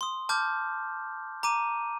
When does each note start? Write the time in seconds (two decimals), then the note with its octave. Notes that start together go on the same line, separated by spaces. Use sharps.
0.01 C6 D#6
0.29 A5 D6 F6 G6
1.43 A#5 D6 D#7